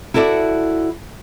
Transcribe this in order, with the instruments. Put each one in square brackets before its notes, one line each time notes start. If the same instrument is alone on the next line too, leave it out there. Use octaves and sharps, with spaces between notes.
[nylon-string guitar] E4 F#4 A4 D5 E5